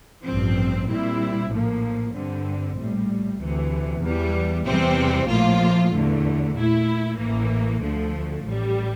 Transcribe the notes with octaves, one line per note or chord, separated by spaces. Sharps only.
A1 G2 F3 C4
A#2 G3 C4 E4
A#1 A2 F3 A#3
G2 D3 G3 C4
A#1 A2 G3
D2 C3 E3
E2 E3 G3
E2 C3 E3 G3 C4
A#1 A2 F3 A#3 F4
E2 D3 A3
A#2 A3 E4
A1 A2 E3 A#3
D2 D3 F3 A3
A1 A2 G3